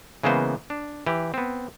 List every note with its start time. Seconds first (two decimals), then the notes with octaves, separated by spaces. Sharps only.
0.23 C#3 E3 G#3 A#3 B3 C5
0.70 D4
1.07 E3 G4
1.34 B3 C4